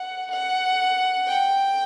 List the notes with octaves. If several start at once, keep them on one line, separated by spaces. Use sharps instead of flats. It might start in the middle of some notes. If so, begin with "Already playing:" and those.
Already playing: F#5
F#5
G5